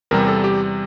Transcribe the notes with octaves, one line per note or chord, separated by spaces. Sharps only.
E2 C3 G3 A#4
A4
G4